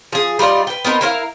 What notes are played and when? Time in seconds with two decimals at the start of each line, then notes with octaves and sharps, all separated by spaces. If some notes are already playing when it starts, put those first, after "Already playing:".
0.12 F3 G#4
0.39 G3 D#4 F4 D5
0.67 B4 G5
0.85 B3 C4 D#4 A#4
1.01 E4 A#4 C5 F5